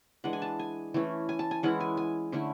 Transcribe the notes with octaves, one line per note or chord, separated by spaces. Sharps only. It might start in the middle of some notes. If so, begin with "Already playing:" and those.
E3 G#3 D4 F#5
G#5
A5
G#5
E3 A3 C#4
G#5
A5
G#5
E3 G#3 C#4 E4 F#5
G#5
G#5
D3 A3 C#4 E4